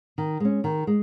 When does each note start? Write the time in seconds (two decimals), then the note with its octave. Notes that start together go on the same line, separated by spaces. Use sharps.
0.18 D#3
0.40 G#3 C#4
0.64 D#3
0.87 G#3